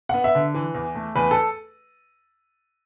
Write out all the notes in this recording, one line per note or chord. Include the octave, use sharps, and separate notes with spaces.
B3 F#5
E5
D3
E3
E2
A3
E2 B4
A4